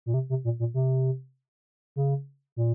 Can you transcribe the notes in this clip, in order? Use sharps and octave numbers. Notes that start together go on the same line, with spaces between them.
A#2
C3
C3
A#2
A#2
C3
C#3
A#2